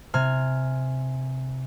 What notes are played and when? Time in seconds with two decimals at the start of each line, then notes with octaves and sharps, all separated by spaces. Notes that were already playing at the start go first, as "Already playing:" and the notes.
0.14 C3 G#5 F6